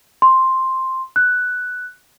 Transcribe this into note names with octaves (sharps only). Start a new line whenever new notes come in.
C6
F#6